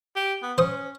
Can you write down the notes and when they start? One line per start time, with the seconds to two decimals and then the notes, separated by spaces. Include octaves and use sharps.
0.16 G4
0.42 B3
0.58 C#4 C5 D#6